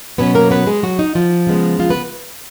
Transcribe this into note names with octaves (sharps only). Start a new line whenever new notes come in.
B2 F#3 B3 C#4 B4
A#3 A#4
B3 B4
G#3 G#4
F#3 F#4
D#4
F3 F4
C#3 G#3 B3
F3 F4
B3 B4